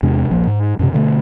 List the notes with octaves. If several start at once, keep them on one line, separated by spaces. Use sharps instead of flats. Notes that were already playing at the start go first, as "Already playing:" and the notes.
E2 C3 G#3 D4
D#1 A#1 F3 A#3
G#2
F#2 A2 C3
B2 D3 G3 A3